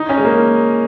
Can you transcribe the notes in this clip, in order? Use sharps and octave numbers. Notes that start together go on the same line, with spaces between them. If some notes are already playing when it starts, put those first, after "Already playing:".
Already playing: D#4
C#4
G#3
A#3